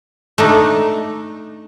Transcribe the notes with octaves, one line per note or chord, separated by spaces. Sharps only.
A3 D4 D#4